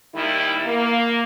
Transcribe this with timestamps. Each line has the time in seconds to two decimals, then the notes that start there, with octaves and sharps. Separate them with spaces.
0.15 D#2 D#3 G3 E4
0.65 A#3